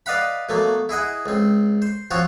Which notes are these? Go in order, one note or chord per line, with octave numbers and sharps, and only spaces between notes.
B4 D5 D#5 F5 F#5 B5
B2 F#3 A3 A#3
E4 G#4 D#5 F#5
C#2 C4
C5
F3 C4 F4 F#4 C#5